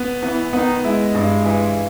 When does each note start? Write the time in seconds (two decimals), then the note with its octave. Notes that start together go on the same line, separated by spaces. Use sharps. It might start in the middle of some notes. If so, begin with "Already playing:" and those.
Already playing: B3
0.23 E3 B3 E4
0.53 D#3 B3 D#4
0.84 G#3 E4
1.14 G2
1.45 E3